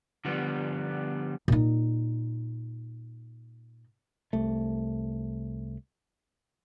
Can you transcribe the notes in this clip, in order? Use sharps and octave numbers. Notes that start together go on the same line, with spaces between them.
D3 F3 G3 B3
A#2 D#4
C2 A3